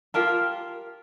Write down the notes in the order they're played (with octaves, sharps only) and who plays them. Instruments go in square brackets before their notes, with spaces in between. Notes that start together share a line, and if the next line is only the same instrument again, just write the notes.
[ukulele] F4 G4 A#4 A5